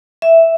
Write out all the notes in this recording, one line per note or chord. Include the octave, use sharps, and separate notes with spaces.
E5